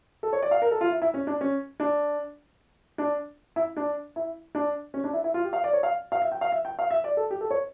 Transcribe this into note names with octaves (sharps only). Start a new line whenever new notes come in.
A4
C#5
D5
F5
A#4
A4
F4
E4
E4
C#4
D4
C#4
D4
D4
E4
D4
E4
D4
C#4
D4
E4
E4
F4
G4
F5
D5
C#5
F5
F5
E5
G5
F5
E5
G5
F5
E5
D5
A4
G4
A4
C#5